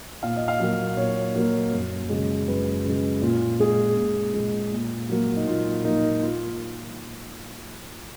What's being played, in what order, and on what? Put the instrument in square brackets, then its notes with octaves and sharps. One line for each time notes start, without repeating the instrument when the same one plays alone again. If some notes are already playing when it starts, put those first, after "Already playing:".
[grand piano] A#2 F5
D#5
F5
F#3 A#3
A#2 C#5
F#3 A#3
F#2
C#3 G#3
F#2 B4
C#3 G#3
A#2 F4
G#3 G#4
A#2
G#3
A#2
F#3 A#3
D#4
A#2 F4
F#3 A#3 D#4
F4